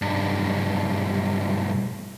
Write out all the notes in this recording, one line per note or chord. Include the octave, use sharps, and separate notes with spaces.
B1 G2